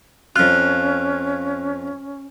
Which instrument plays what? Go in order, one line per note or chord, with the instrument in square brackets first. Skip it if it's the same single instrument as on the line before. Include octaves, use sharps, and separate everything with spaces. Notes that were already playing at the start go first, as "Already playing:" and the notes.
[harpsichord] F2 F4 [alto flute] C#4 [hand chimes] F#6